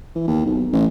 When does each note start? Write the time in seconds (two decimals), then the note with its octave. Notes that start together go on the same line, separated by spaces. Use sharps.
0.16 E3
0.28 D#2
0.46 B1
0.73 A1